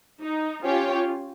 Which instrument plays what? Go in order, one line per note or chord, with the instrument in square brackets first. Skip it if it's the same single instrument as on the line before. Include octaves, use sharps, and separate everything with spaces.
[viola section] D#4
[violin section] C#4 G4 C#5 G5 [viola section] F4